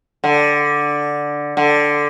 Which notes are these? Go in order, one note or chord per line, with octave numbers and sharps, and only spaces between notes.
D3
D3